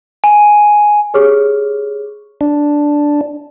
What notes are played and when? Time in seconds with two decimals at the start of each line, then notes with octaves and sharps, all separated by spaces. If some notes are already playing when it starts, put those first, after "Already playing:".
0.24 G#5
1.14 G4 G#4 C#5 C#6 D6 F6
2.41 D4